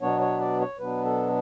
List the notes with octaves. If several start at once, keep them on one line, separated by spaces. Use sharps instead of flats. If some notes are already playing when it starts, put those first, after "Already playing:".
B2 F#3 B3 D4 C#5
C#5
D5
C#5
B2 F#3 B3 D4 B4
A4